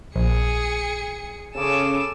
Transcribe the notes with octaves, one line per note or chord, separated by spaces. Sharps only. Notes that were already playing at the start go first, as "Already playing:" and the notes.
A#1 G#4 C#7
C#3 A4 G#5 D6 E7